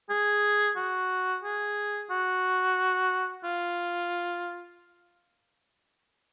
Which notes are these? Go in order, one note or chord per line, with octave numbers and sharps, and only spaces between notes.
G#4
F#4
G#4
F#4
F4